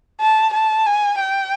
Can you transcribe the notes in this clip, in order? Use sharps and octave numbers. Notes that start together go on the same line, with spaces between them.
A5
A5
G#5
G5